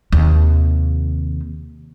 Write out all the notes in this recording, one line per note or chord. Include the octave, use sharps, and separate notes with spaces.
D#2 C3